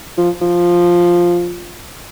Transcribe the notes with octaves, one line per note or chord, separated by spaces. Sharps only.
F3
F3